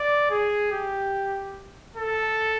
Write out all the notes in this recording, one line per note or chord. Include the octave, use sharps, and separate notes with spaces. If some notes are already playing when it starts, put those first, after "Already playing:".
Already playing: D5
G#4
G4
A4